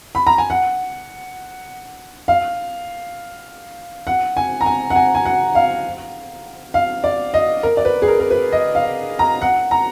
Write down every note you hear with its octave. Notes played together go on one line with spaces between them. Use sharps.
B5
A#5
G#5
F#5
F5
F#5
G#5
A#5
G#5
F#5
G#5
G#5
F#5
F5
F5
D5
D#5
A#4
D5
B4
G#4
A#4
A#4
B4
D#5
F5
A#5
F#5
A#5